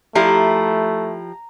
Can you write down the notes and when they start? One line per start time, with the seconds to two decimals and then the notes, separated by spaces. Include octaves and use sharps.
0.15 F3 A3 E4 G4 A#5